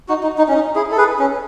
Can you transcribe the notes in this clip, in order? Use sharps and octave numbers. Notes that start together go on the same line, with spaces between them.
D#4 F#4
D#4
D#4
C#4
D#4
E4 G#4
A4
G#4 B4
C#4